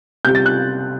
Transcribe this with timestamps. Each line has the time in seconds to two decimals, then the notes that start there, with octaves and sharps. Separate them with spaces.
0.25 C3 G3 G6
0.35 A6
0.46 F#6